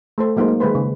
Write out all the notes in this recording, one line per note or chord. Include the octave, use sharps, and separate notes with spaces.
A3 A4 C5
F#3 G#3 A#3 D#4 A#4 C5
A#3
D#3 G#3 G4 B4 C5
C#3